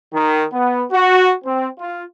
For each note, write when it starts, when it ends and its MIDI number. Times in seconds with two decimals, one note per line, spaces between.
0.13 0.44 51
0.52 0.84 59
0.91 1.33 66
1.44 1.67 60
1.79 2.02 65